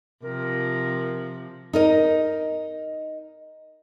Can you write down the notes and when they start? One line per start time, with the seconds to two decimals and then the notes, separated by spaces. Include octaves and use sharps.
0.23 C3 F3 A#4
1.73 D#4 A#4 D#5